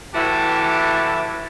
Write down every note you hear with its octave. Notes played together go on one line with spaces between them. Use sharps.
A2 E3 E4 F#4 G4 A5